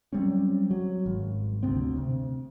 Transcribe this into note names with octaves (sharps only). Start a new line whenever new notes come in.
F#3 G3 C4 C#4
F#3
G#1
D2 C3 B3 C4
C3